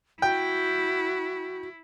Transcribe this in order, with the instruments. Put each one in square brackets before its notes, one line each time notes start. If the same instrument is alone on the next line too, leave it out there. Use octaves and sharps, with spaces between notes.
[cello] E4 [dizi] F#4 [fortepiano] G5